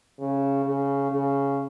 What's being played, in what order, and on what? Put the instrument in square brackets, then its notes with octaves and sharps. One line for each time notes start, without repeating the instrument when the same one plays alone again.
[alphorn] C#3
C#3
C#3